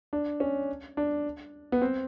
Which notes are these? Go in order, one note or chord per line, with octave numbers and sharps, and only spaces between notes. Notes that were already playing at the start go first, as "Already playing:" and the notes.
D4
C#4
D4
B3
C4